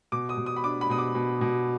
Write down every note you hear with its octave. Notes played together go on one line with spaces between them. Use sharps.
B2 D6
D#6
B2
D#6
B5
D4 D6
B5
B2 D#6
D6
B2
B2